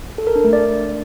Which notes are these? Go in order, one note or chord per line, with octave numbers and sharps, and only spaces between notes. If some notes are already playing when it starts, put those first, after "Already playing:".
A4
A#4
D4
A3
D5